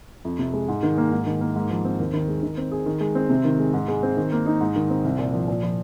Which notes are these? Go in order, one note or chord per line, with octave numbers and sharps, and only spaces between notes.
F2
C3
G#3
G#2
D#3
A#3
G#2
D#3
A#3
G#2
F3
C4
D#2
D#3
G#3
D#3
C4
G#4
D#3
G#3
C4
C3
D#3
G#3
G#2
G#3
C4
D#3
A#3
D#4
G#2
D#3
C4
C2
A#2
F3
A#2
F3